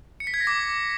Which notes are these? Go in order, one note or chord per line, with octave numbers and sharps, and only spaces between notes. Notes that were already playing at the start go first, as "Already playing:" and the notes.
C#7
B6
G#6
A#6
D6